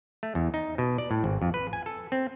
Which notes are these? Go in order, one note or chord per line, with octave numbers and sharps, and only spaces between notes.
A3
E2
D#4
B2
D5
A2
G#1
F2
B4
G#5
A4
C4